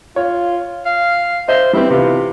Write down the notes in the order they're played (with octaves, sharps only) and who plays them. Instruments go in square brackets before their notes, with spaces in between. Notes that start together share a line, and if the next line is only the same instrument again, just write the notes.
[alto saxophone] F4 [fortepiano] C#5
[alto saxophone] F5
[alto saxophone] C5 [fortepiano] D#5 E5
[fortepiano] G3 B3 C4 [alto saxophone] E4
[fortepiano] C3 E3 B3 [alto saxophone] F4